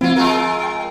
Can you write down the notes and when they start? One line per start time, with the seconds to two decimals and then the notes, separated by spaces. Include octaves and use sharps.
0.01 F3 C4 E4 F4
0.16 G#3 F4 A#4
0.63 G5